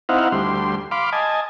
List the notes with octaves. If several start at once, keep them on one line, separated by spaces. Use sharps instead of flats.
C4 D#4 E4 F5 F#5
D2 G3 C6
F5 B5 C6 D6
D#5 G#5 A5